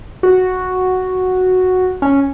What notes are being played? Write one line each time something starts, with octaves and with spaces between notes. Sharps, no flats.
F#4
C#4